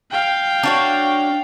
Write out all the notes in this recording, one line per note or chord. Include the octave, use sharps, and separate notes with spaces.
F5 G5
D4 F#4 C#5